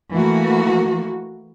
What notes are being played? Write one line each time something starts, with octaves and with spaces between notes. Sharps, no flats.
E3 A3 A#3 F#4